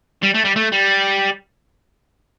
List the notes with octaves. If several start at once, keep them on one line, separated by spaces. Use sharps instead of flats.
G3
A3
G3
A3
G3